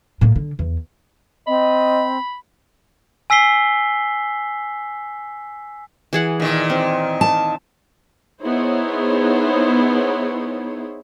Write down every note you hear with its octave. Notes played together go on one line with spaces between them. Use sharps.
A2 A#3
D3
E2
C4 D#5 B5
G#5 E6 B6 C7 G7
E3 G#4 F#5
A#2 D#3
C4
A5
B3 D#4 E4 G#4 C5 C#5